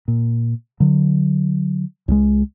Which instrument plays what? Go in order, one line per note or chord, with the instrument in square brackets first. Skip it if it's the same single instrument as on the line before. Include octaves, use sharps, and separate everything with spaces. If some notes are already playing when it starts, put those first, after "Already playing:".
[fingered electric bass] A#2
D3 F#3
C#2 F3 G#3